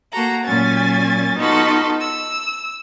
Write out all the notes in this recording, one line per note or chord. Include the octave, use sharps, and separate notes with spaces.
A#3 F#4 A4 A#5
A#2 F#3 C#4 G#5 A6
B3 D#4 F4 F#4 A4
E6